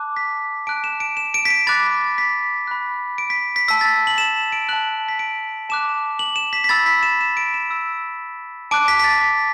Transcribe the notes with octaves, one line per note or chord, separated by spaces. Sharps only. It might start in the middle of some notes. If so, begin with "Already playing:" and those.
Already playing: A5 D6 F#6
B6
A5 F#6 D7
E7
D7
E7
D7
B6
D7
B5 D6 F#6 A6
B6
B5 F#6
D7
B6
B6
A5 E6 B6
A6
B6
F#7
E7
D7
A5 F#6 F#7
B6
D7
A5 D6 F#6 E7
F#7
E7
B6
B6
B5 E6 A6
B6
E7
E7
D7
E7
B5 E6
A5 D6 F#6 D7
B6
B6
A6
B6